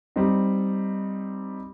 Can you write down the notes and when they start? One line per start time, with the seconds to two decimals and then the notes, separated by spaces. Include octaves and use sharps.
0.16 G3 C4 D#4